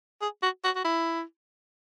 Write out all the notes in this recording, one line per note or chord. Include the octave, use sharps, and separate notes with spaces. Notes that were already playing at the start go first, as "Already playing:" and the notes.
G#4
F#4
F#4
F#4
E4